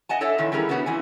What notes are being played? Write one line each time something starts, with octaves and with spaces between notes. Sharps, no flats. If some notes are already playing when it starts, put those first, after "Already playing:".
D#5 F#5 G#5 A5
A4 C#5 D5 E5 F#5
A#2 D#3 E3
E3 G3 C#4 G#4 A#4
C#3 B3 C#4 F#4 G#4
F2 E3 G#5